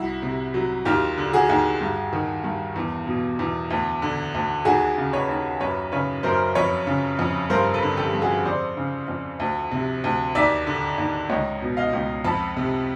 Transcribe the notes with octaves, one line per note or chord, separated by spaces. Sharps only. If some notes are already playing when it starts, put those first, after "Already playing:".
Already playing: C2 E4 F#4
C3
F#3
D#2 F4 G4
D3
F#4 G#4
D#2
G2
D#3
G2
E2
B2
E2
D2
D3
D2
D#2 F#4 G#4
C#3
B4 C#5
D#2
F#2 B4 C#5
C#3 B4 C#5
F#2 A#4 C5
F2 B4 C#5
C#3
F2
G2 A#4 C5
A4 B4
D3
G4 A4
G2
F#4 G#4
F2 C5 D5
C#3
F2
D2
C3
D2
D#2 D5 E5
D3
D#2
C#2 C#5 D#5
B2
D#5 F5
C#2
F2 A5 B5
C3